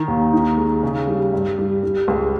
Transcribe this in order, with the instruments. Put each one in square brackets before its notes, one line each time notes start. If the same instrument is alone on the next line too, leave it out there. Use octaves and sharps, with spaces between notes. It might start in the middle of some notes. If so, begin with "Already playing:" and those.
Already playing: [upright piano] D#3
D#2
D#4
G#3
C#3
G3
G2
G3
G3
C#2